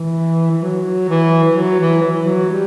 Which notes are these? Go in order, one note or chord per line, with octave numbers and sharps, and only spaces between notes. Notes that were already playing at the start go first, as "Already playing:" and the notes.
Already playing: E3
E3
F#3
E3
E3
F#3
E3
E3
F#3
G3